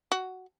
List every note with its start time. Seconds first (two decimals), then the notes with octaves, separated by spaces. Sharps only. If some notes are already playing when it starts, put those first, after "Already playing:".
0.12 F#4